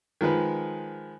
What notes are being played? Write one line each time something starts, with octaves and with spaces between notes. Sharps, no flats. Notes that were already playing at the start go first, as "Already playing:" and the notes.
D#3 F3 G#3 B4